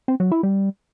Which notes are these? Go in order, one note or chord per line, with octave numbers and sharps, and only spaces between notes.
C4
F#3
E4
G3